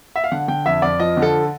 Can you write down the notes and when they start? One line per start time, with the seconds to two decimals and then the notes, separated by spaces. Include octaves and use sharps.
0.16 E5
0.24 F5
0.32 D3 F#5
0.48 D3 G5
0.65 F2 E5
0.82 F2 D5
1.00 F3 D#5
1.17 D3
1.22 A4